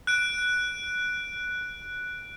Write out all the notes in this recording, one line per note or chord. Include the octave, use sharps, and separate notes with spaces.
F#6 D7